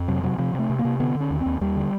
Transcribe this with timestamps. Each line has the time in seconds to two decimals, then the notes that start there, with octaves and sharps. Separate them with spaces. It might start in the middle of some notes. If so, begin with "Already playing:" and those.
Already playing: F2
0.08 C3 F#3
0.23 C3 F#3
0.38 C3 F3
0.54 C3 A3
0.70 C3
0.79 A#3
0.85 C3
1.00 D3 B3
1.15 D3
1.20 C#4
1.30 D#2
1.41 C4
1.46 D#2
1.61 D#2 G3
1.76 D3